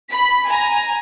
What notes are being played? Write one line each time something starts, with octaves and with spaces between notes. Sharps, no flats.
B5 B6
G#5 A#5